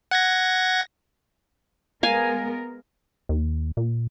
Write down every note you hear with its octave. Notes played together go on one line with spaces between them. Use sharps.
F#5 G#6 A#6
G#3 B3 A#4 F5 G#5
D#2
A#2